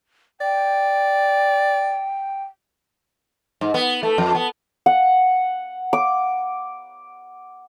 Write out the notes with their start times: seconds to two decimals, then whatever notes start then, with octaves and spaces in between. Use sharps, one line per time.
0.41 D5 G5
3.61 G#2
3.74 B3
4.03 A3
4.18 F2
4.35 B3
4.86 F#5
5.93 D6